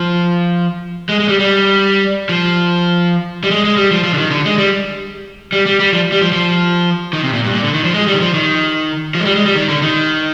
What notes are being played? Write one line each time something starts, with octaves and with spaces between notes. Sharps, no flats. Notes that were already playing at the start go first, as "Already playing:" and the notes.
Already playing: F3
G#3
G#3
G3
G3
F3
G3
G#3
G#3
G3
F3
F3
D3
D#3
D3
G#3
G3
G3
G3
G3
F3
G3
F3
F3
D#3
C3
A#2
G2
A#2
D3
D#3
F3
G#3
G3
D#3
F3
D#3
F3
G#3
G3
G#3
G3
D#3
D3
D#3